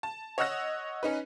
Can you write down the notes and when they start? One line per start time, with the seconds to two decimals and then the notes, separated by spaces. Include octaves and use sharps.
0.03 A5
0.38 C#5 D#5 F#5 E6 F#6 A#6
1.03 C#4 D#4 B4